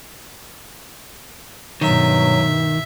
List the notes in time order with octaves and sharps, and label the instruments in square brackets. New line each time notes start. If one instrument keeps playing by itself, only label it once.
[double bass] G2 B2 [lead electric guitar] D#3 [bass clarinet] F#3 [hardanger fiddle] E5